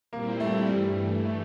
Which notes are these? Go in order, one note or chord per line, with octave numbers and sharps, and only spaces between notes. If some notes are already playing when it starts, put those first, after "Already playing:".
A#2 G3 A#3 C4 E4
A3
G2 E3 G3 A3
A3